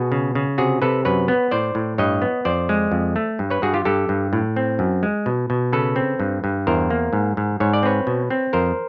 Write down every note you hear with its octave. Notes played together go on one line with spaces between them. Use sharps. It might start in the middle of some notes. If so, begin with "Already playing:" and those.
Already playing: B2 F#4 G#4
C#3
C#3
C3 F#4 G#4
C3 A4 B4
F#2 B4 C#5
B3
A2 C5 D5
A2
G2 C#5 D#5
B3
F2 C5 D5
G#3
F2
A3
G2
B4 C#5
G2 F#4 G#4
F4 G4
G2 G4 A4
G2
A2
C4
F#2
G#3
B2
B2
C#3 A4 B4
C4
G2
G2
E2 A#4 C5
A#3
G#2
G#2
G#2 C#5
D5
C4 B4 C#5
B2
C4
F2 A#4 C5